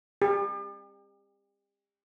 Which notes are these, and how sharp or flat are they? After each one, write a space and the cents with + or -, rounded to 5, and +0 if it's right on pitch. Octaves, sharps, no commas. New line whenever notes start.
G4 +40